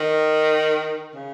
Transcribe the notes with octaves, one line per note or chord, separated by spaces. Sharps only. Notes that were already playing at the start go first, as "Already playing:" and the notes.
Already playing: D#3
C#3